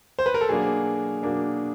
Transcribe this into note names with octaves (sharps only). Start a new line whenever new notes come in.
C5
B4
A#4
A4
B2 F#3 A#3 D4 G#4
B2 F#3 A#3 D4